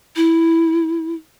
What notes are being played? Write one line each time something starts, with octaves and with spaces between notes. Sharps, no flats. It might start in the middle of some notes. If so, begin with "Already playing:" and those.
E4